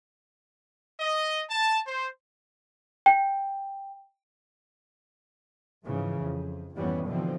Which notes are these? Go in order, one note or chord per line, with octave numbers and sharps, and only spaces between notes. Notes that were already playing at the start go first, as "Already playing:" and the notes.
D#5
A5
C5
G5
G#2 C#3 E3 F3
F2
G#1 F2 E3 G3 B3 C#4
B2 D3 E3 F3 C4